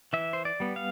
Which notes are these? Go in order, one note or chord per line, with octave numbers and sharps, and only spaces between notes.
E3 E5
C5
D5
G3 B3
F5